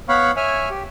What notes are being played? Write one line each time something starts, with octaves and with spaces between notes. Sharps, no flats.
B3 C#5 F5 F#5 B5 C#6
C#5 E5 G#5 F6
G4